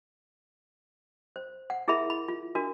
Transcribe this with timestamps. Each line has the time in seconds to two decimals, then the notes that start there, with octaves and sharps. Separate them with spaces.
1.36 C5
1.70 F#5
1.88 E4 G#4 A#4 E5 B5
2.10 B5
2.28 F4
2.55 D4 F#4 A#4